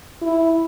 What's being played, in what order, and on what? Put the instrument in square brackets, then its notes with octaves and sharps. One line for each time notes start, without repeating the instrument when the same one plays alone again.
[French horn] E4